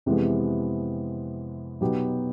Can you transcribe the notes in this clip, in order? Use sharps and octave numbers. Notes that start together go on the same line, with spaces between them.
F2 C3 E3 G#3 B3
B2 F#3 B3 D#4 G4